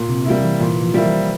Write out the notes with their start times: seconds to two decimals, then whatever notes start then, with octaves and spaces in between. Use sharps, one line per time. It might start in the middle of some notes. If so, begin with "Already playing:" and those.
Already playing: A#2
0.09 C3
0.25 C3 G3 A#3 E4
0.43 E3
0.60 A#2 E3
0.83 F3
0.94 G3 A#3 E4
1.05 E3